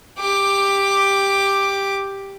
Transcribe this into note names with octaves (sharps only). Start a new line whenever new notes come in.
G4 D6